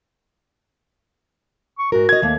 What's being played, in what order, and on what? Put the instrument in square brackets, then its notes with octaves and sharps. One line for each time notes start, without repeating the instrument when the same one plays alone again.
[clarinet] C#6
[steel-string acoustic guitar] G#2 A#4 [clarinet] F#4
[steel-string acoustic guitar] A#4 D#5 [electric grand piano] G#6
[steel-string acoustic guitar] D#2 A3 [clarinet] A#3